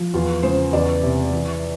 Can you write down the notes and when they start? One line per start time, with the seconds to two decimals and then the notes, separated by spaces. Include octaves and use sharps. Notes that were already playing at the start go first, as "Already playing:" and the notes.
Already playing: F3
0.14 E2 F4
0.43 C#3 C5
0.73 E2 D5
1.02 C3
1.32 E3